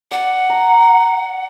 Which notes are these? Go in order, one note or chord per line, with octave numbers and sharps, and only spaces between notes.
D5 F#5
A#5